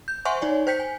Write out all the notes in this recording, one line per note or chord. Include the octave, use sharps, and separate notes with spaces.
G6
C5 E5 F#5 G#5 C6 C#6
D#4 C#5 D5 G#5
C5 G5 G6 B6 C#7
G#5